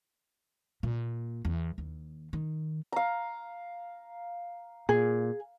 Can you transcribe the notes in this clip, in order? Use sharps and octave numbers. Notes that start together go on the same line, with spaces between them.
A#2
E2
D#2
D#3
F5 A#5
A#2 G#4